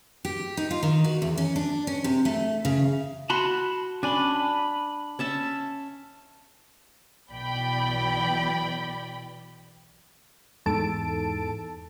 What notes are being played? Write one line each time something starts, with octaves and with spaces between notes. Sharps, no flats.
G4
D#4
F4
D#3
F#4
E2
C#4
D4
C#4
C3
A3
C#3
F#4 A5 B5 C6
C#4 D4 G#5 B5
B5
C#4 E5 A5
B1 B2 E3 D5 G5 B5
E2 G#2 A4 A5 D7